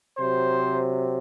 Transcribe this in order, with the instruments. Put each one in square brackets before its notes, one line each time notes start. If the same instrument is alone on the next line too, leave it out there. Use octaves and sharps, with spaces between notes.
[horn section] C3 F#3 C5